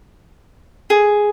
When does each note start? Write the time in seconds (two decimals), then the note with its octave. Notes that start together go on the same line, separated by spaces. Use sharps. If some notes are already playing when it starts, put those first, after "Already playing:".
0.90 G#4